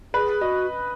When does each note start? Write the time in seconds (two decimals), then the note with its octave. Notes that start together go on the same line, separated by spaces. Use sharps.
0.14 G#4 B4
0.41 F#4 D#5